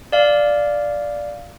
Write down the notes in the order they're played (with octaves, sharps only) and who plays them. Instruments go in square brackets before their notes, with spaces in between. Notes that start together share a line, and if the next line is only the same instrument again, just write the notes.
[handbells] D5 F5